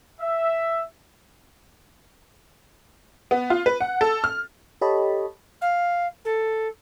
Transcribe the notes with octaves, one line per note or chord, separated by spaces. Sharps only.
E5
B3
F4
B4
F#5
A4
F6
G4 A4 C#5 D#5 A5 B5
F5
A4